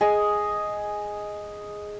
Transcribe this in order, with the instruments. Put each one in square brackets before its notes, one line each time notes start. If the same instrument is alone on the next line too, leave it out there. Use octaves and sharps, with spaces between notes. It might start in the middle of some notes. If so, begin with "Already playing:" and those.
[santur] G#4 D#5 G#5